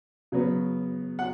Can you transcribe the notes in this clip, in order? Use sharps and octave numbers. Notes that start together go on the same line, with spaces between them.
C#3 F#3 B3
F#5